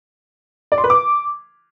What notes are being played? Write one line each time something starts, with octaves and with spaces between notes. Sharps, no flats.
D5
C6
B4
D6